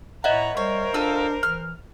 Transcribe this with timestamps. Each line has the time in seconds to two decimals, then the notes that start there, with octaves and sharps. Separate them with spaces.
0.24 A2 B4 C#5 D#5 E5 F#5 A#5
0.57 G3 A#4 C5 C#5
0.94 D4 F4 A4 E6
1.43 E3 F6